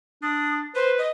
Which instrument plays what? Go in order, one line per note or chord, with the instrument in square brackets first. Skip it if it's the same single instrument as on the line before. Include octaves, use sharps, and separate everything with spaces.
[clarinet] D4 [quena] D#6
[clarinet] B4 [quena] C5
[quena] D#5